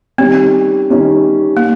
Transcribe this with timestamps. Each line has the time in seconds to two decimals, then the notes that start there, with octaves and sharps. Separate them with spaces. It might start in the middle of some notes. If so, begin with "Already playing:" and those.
0.18 D#3 G3 C4 C#4
0.90 D#3 G3 C#4
1.57 A#3